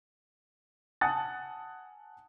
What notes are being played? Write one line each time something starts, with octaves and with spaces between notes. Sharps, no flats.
F#5 G#5 A5 D#6 F#6 A6